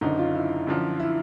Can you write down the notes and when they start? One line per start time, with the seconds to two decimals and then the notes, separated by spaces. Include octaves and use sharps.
0.01 F#1 F#2 D3 D#4
0.19 F4
0.35 E4
0.67 F#2 D3 F3
1.00 E4